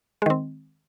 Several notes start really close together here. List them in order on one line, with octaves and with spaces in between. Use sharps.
G#3 D#3 C4